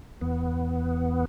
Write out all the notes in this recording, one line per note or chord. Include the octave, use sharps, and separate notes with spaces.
E2 B3